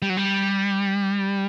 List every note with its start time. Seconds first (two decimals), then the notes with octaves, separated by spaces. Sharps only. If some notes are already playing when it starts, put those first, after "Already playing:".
0.02 G3
0.10 F#3
0.17 G3